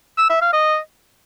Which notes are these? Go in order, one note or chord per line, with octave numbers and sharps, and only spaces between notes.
E6
E5
F5
D#5